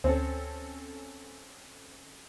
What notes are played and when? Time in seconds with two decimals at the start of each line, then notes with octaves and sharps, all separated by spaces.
0.04 D2 C4 C#4 A4 C5